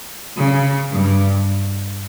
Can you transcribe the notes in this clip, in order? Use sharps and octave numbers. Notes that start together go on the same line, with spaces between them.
C#3
G2